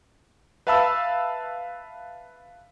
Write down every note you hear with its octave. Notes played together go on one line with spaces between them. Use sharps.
B4 E5 F5 A5 B5 E6